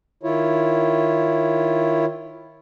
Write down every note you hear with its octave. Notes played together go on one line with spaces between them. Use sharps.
D#3 E4 F4 C#5